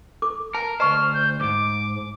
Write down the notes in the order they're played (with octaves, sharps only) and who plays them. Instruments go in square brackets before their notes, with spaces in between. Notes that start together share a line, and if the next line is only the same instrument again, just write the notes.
[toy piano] A4 D6
[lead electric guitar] A#4 [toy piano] A5
[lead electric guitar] D2 C5 [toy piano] D#5 A5 C#6 [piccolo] F6
[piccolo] G6
[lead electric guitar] C#2 G#2 [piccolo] D6